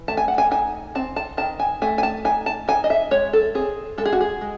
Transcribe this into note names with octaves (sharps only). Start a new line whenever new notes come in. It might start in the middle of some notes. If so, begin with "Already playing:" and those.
Already playing: E3
A3 A5
G#5
F#5
G#5
D#4 G#5
C4 A5
A5
D#3 A5
G#5
A3 G#5
G#5
A5
D#4 G#5
A5
D#4 G#5
D#5
E5
G#3 C#5
A4
C4 G#4
G#3 A4
G#4
F#4
G#4
G#3